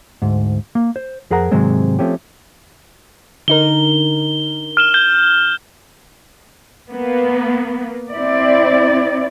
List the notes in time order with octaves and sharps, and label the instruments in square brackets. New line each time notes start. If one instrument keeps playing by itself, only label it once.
[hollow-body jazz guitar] D2 G#2
A#3
C5
F2 G#4 A#4 F#5 A#5
G#2 C3 D#3 F#3 G#3 C4
F3 A3 C4 C#4 G4
[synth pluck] D3 D#4 A#4 [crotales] G7
[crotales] F6 E7 G7
G6 G7
[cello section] A#3 B3
C4 E4 D5